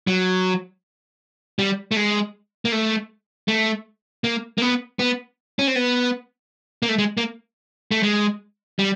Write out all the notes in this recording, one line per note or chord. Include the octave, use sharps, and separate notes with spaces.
F#3
G3
A3
G#3
A#3
A3
A3
A#3
A#3
B3
B3
C#4
C4
B3
A#3
A3
G#3
A#3
A3
G#3
G3